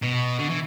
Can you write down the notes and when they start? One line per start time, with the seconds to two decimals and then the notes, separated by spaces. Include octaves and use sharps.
0.02 B2
0.39 D3
0.50 E3